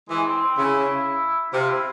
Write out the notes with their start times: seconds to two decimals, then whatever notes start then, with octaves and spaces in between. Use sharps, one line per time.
0.09 E3 G#3
0.26 C4
0.42 C4
0.57 C#3 E4
1.53 C3 F4
1.69 E4